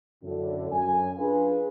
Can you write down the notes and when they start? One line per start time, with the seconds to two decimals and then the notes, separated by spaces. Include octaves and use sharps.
0.23 F#2 A2 D3
0.71 F#2 G#5
1.18 D4 F4 G#4 B4